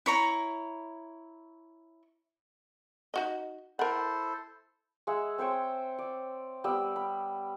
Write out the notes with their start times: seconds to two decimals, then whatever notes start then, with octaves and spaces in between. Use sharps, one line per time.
0.06 E4 C#5 A#5
3.14 D#4 F#4 D#5
3.79 E4 A4 A#4 C5 F#5
5.07 G#3 G#4 E5 F#5
5.38 C4 C5 C#5 G5
5.98 D5
6.64 G3 B3 G4 E6
6.96 B5